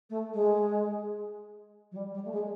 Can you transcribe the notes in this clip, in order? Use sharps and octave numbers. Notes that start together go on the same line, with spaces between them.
A3
G#3
F#3
G3
G3
A3
G#3